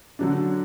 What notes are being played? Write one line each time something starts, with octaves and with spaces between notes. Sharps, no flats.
D3 F#3 D4